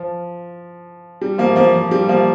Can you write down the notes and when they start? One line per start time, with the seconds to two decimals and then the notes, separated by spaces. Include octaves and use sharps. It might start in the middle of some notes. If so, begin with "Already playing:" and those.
Already playing: F3
1.21 G3
1.38 F3 A#3
1.56 F3 A#3
1.74 F3
1.91 G3
2.09 F3 A#3